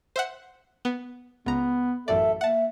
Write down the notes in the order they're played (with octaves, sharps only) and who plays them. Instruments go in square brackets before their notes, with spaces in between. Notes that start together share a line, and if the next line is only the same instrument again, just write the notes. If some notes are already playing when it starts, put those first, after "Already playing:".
[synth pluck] C5 E5 F#5
B3
[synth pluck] C#2 A#5 [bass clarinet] B3
[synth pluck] A1 F#2 D5 [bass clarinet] A4 [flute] E5
[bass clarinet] A#3 [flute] E5 [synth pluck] F#5 A5